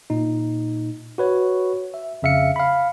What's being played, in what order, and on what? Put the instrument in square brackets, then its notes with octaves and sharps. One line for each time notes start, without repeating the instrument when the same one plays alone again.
[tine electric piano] A#2 D#4
F#4 B4 C#5
E5
F2 C#3 E5 F5 C#7
F5 B5